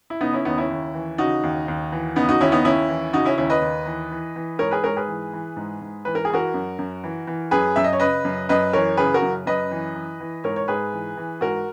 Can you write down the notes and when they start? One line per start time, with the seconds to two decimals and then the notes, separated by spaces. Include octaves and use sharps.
0.10 E4
0.21 C#3 B3 D#4
0.33 C#4 E4
0.45 D#2 B3 D#4
0.58 C#4 E4
0.70 D#2
0.94 E3
1.18 C#3 D#4 F#4
1.43 D#2
1.68 D#2
1.92 E3
2.16 C#3 B3 D#4
2.29 D#4 F#4
2.40 D#2 C#4 E4
2.52 B3 D#4
2.65 D#2 C#4 E4
2.89 E3
3.13 C#3 D#4 F#4
3.25 C#4 E4
3.38 D#2 C#4 E4
3.50 B4 D#5
3.62 D#2
3.86 E3
4.12 E3
4.36 E3
4.59 G#2 A#4 C#5
4.71 G#4 B4
4.84 G#2 A#4 C#5
4.97 G#4 B4
5.08 E3
5.33 E3
5.56 G#2
5.81 G#2
6.05 E3 B4
6.15 A#4
6.25 G#4
6.30 E3 F#4 A#4
6.54 F#2
6.79 F#2
7.04 E3
7.27 E3
7.51 F#2 G#4 B4
7.76 F#2 E5
7.84 D#5
7.93 C#5
8.00 C#3 B4 D#5
8.25 F#2
8.49 F#2 B4 D#5
8.73 E3 A#4 C#5
8.97 C#3 G#4 B4
9.14 F#4 A#4
9.22 F#2
9.46 F#2 B4 D#5
9.71 E3
9.95 E3
10.20 E3
10.44 G#2 A#4 C#5
10.56 C#5
10.68 G#2 G#4 B4
10.93 E3
11.17 E3
11.41 G#2 F#4 A#4